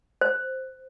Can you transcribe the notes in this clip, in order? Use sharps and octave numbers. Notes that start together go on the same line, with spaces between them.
C5